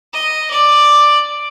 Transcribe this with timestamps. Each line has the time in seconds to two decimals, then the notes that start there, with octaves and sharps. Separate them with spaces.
0.14 D#5
0.50 D5